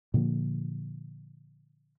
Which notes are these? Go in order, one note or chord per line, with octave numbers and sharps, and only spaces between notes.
A#2 D3 F3 A#3